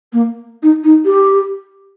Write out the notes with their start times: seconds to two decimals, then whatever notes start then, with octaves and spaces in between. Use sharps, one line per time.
0.13 A#3
0.62 D#4
0.84 D#4
1.05 G4